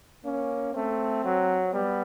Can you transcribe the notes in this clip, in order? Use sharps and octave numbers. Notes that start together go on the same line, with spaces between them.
A#3 C#4
A3 C4
F#3
G3 B3